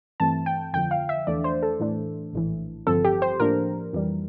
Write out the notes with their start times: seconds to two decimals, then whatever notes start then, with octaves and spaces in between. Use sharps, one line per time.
0.20 G2 E3 A3 C4 A5
0.46 G5
0.73 F2 D3 F3 G5
0.91 F5
1.09 E5
1.27 E2 E3 A3 D4 D5
1.44 C5
1.63 A4
1.80 A2 E3 A3 D4
2.33 A#1 A2 E3
2.87 G1 G2 F3 C4 A4
3.05 G4
3.22 C5
3.40 A2 F3 A#3 D4 A#4
3.93 F2 E3 G3